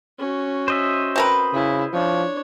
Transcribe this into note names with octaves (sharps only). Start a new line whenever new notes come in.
C#4 F#4
C5 D#5 E5
C4 A#4 B4
C#3 E4
F3 D4 C#5